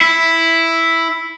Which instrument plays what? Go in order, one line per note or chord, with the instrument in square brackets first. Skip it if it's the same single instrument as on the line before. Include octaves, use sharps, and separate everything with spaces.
[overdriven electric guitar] E4